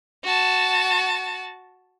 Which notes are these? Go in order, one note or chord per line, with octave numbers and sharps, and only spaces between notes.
F#4 A5